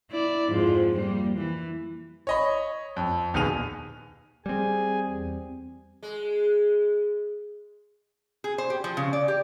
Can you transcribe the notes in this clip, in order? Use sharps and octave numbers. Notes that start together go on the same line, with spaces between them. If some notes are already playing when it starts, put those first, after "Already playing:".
E4 D5
F2 G#2 F3
G3 A#3
E3
C#5 D#5 B5
F2
D#1 D#2 B2 G#4 D#7 F7
G3 C4 G#4 G#5
E2
G#3
G#4
C5
G4
F3
C#3
D5
G4